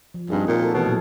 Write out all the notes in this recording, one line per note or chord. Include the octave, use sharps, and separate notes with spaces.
F3
G2 C4 D#4 G#4
A#2
F#4 A4 A#4
B2 E3 A3 C#5
A#2 F#3 A4